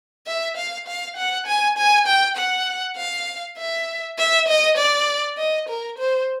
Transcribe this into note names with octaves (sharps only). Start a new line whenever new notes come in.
E5
F5
F5
F#5
G#5
G#5
G5
F#5
F5
E5
E5
D#5
D5
D#5
A#4
C5